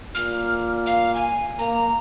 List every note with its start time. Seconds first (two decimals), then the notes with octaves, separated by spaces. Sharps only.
0.15 A#2 F6
0.86 F5
1.15 G#5
1.59 A#3 A#5